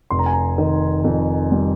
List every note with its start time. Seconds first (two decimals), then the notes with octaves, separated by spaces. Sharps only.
0.10 F1 C6
0.19 A#5
0.26 G#5
0.33 A#5
0.58 D#3
1.04 F2
1.52 G3